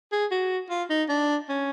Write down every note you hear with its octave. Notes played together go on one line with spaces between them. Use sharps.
G#4
F#4
F4
D#4
D4
C#4